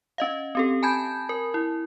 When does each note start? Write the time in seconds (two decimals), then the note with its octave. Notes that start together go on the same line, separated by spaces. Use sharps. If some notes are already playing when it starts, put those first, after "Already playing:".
0.18 C#4 D#5 F5
0.55 C4 G4 A4
0.83 G#5 A5 B5 G6 G#6
1.29 A#4
1.54 E4